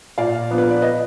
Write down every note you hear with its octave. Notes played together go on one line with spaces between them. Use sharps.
A#2 D5 F5
F3 B3 D4
B4
D5
B4 D#5